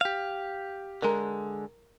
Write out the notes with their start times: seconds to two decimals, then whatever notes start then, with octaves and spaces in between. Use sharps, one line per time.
0.01 G4 F5
1.02 D3 G#3 A#4 A#5